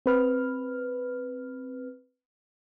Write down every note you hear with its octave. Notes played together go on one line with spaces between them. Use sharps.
C4 B4 F6